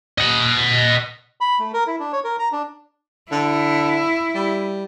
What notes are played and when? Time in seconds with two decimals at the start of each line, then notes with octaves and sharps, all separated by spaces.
0.18 D#5 F#5
1.41 B5
1.59 A3
1.73 A#4
1.87 E4
1.99 D4
2.13 C#5
2.24 A#4
2.39 A#5
2.52 D4
3.31 D3 E4
4.34 G3